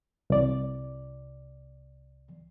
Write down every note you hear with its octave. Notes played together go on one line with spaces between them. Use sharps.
C2 D5